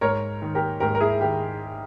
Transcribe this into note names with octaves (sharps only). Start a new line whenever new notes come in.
G#2 A#4 C#5
D#3
G4 A#4
G#2 G4 A#4
A#4
E4 G#4
D#3 G4 A#4